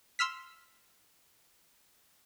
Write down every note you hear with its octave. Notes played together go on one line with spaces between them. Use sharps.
C6 E6 F6 B6